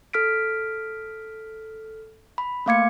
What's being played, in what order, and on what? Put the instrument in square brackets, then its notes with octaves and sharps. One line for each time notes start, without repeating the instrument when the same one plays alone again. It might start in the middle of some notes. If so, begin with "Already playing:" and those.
[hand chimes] A4 F6 B6 D7
B5
A3 A#3 F5 D6 G#6 C#7